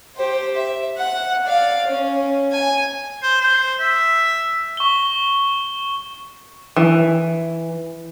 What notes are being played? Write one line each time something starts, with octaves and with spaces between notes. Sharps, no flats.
G4 C5
E5
F#5
D5 F5
C#4
G#5
C5
C5
E5
C#6 G7
E3